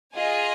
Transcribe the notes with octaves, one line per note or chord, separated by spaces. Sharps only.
F4 G#4 D#5 G#5